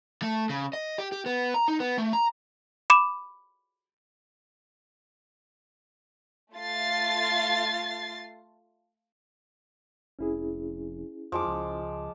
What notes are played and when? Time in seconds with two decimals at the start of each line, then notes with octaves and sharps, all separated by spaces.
0.22 A3
0.49 C#3
0.73 D#5
0.98 G4
1.12 G4
1.26 B3
1.54 A#5
1.68 D#4
1.80 B3
1.98 A3
2.13 A#5
2.90 B5 D6 E7
6.55 A3 F4 A6 C7
10.19 F1 C#4 E4 G#4
11.32 F2 F3 G#3 D6
11.47 C#2